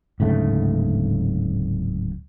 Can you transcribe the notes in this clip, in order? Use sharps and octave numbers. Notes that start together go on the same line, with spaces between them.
D1 G#2 C#3 A3